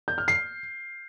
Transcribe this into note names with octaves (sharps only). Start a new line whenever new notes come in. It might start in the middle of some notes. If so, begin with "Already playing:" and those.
G6
F6
C7